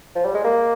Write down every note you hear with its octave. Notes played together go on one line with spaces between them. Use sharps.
F3
G3
G#3
A#3